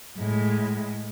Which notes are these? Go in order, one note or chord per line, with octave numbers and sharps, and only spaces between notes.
A2 G#3